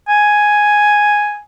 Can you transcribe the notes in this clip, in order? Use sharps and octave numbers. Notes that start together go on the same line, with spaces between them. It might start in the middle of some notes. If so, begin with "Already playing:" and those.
G#5